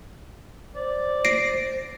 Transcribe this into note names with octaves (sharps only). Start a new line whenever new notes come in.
C5 D5
A#6 C7 D7